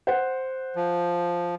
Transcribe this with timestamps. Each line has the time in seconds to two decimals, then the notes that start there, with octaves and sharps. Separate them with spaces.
0.07 C5 F#5
0.76 F3